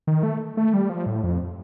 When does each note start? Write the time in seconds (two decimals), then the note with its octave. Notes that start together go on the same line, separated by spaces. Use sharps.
0.07 D#3
0.23 A3
0.57 A3
0.74 G3
0.90 F3
1.06 A2
1.23 F2